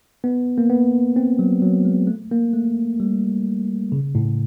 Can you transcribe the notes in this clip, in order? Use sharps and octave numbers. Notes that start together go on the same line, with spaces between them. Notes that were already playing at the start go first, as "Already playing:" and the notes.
B3
A#3
B3
C4
F#3
F#3
G#3
A3
A#3
A3
G3
C#3
A2